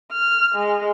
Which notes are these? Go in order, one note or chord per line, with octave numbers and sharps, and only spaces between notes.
F6
G#3